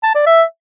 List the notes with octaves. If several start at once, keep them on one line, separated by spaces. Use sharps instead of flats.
A5
D5
E5